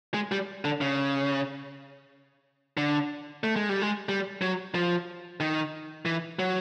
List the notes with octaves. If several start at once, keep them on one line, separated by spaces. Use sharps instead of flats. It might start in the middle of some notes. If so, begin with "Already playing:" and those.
G#3
G3
D3
C#3
D3
A3
G#3
G3
G#3
G3
F#3
F3
D#3
E3
F#3